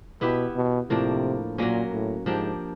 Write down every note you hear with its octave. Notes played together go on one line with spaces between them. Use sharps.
B2 B3 E4 G4 B4
B2
A2 C3 F3 A#3 D4
A#2 F#3 A#3 C#4
A2
G#2 F3 A#3 D4 G4